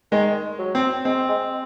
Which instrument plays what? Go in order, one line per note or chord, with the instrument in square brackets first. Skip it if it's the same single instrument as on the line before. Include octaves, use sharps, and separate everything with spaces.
[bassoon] D#3 [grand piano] G#3
[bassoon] F#3
[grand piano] C4
[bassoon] G#3 [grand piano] C4
[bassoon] G#3